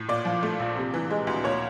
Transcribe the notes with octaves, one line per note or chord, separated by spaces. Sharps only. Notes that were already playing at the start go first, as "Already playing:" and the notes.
Already playing: A2
A#2 D5
F3
A3
A#1
C3
E3
G#3
D2
A#2 C#5